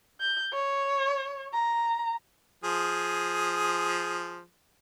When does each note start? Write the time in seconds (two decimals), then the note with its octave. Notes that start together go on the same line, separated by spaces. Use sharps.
0.21 G6
0.54 C#5
1.54 A#5
2.64 F3 G#4